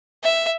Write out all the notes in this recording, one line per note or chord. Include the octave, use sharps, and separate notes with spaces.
E5